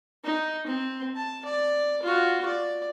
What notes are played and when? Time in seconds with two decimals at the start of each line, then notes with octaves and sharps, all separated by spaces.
0.24 D#4
0.67 C4
1.16 A5
1.45 D5
2.03 F4 F#4
2.46 D5